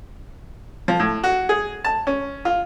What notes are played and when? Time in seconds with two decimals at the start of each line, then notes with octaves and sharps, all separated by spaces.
0.88 F3
1.00 A2
1.23 F#4
1.49 G#4
1.84 A5
2.07 C#4
2.45 F4